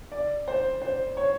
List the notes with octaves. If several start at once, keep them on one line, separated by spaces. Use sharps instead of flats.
D5
C5
C5
C#5